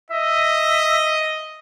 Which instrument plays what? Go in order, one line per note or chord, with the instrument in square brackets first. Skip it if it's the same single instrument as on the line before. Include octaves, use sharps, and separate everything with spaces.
[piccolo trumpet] D#5 [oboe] E5